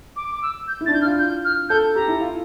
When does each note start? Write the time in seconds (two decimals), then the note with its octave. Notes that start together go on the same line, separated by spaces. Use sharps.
0.16 D6
0.31 D6
0.43 E6
0.68 G6
0.81 E4
0.86 D4 A6
0.93 E4 G6
1.02 F6
1.06 F4
1.19 G6
1.45 F6
1.69 A4 G6
1.95 G4 A#5
2.08 E4
2.21 F4